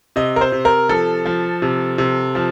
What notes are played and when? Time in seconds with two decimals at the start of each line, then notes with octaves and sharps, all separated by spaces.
0.16 C3 D#5
0.36 A#4
0.41 C5
0.52 C3
0.65 A#4
0.89 F3 A4
1.25 F3
1.62 C3
1.98 C3
2.35 F3